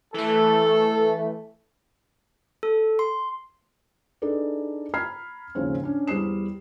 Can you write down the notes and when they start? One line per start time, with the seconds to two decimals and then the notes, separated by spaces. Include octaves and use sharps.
0.14 E3 A3 A4
2.63 A4
2.99 C6
4.22 D4 D#4 G#4 A4 B4 D5
4.94 A#5 B5 F6 G#6 C7
5.55 D#2 G#2 C#3 F3 C4 C#4
5.83 C#4 D4
6.07 E2 G3 C5 D#6 C7 E7